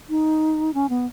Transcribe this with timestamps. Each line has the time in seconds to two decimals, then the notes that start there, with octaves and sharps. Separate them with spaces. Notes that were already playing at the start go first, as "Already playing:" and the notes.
0.09 D#4
0.74 C#4
0.89 B3